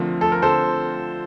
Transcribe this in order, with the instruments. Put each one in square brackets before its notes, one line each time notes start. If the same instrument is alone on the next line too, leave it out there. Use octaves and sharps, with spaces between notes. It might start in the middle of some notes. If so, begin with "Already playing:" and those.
Already playing: [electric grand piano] D3 F3 A3 C4 F4 [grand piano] A#4
[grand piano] A4
A#4
[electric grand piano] D3 F3 A3 C4 F4 [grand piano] A4 C5